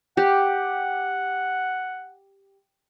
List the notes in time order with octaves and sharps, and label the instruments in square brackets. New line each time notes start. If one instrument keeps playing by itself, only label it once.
[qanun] G4 [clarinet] F#5